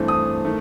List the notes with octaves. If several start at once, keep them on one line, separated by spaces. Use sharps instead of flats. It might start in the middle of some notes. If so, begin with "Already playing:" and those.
Already playing: G2 E3 A3 C4
D#6
D#3 A3